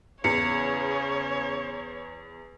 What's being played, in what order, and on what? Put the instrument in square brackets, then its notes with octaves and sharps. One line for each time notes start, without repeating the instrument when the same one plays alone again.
[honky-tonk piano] E2 [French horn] C#3 [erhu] C#5 [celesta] C#7